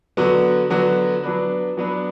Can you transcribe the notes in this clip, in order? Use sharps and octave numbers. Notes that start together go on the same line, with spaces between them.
D3 F#3 B3 F#4
D3 F#3 B3 F#4
F#3 B3 D4 B4
F#3 B3 D4 B4